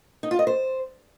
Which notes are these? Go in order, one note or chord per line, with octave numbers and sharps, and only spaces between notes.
D#4
F4
D#5
C5